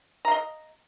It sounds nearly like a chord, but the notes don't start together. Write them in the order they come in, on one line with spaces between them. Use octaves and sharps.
A#5 F5 D#5